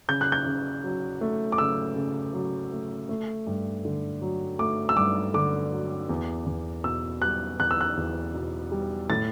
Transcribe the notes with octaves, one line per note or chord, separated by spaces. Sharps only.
C#3 G6
F#6
G6
C#3
F#3
A3
D6
C#3 E6
C#3
F#3
A3
A3
G2
D3
F#3
A3 D6
E6
G2 D6
D3 D6
F#3
E2
E2
B2 E6
G3 F#6
E2 F#6
E6
F#6
E2
B2
G3
A2 A6